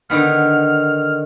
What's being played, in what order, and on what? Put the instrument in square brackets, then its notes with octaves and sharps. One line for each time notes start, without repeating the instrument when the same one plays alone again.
[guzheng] D3 D#3 B3 [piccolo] F6